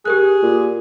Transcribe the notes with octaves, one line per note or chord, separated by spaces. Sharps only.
G4 G#4 A#4 F#6
A#2